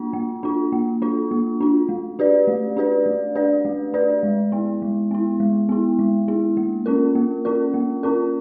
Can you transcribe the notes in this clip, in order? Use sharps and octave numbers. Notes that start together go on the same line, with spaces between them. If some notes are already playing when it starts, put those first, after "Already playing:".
Already playing: A#3 D4 F4
A#3
D4 F4
A#3
D4 F4
A#3
D4 F4
A3
D4 G4 B4 D5
A3
D4 G4 B4 D5
A3
D4 G4 B4 D5
A3
D4 G4 B4 D5
G#3
B3 E4
G#3
B3 E4
G#3
B3 E4
G#3
B3 E4
A#3
C#4 F4 A#4
A#3
C#4 F4 A#4
A#3
C#4 F4 A#4